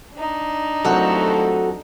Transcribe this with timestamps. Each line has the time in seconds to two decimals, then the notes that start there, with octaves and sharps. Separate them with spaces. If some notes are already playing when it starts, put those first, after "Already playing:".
0.15 D4 D#4
0.85 D#2 F3 F#3 A3 C4 E4 F#4 A4